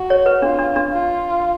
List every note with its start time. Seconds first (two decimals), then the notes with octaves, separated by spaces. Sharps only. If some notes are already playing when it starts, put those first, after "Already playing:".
Already playing: F#4
0.10 C#5
0.26 B4
0.42 D4 F4
0.59 D4
0.76 D4
0.92 F4